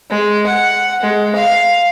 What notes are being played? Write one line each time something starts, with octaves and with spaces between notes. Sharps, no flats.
G#3
F#5
G#3
F5